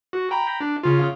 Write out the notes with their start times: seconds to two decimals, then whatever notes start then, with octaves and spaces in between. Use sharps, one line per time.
0.13 F#4
0.31 G5 A#5 B5
0.61 D4
0.83 C#3 F4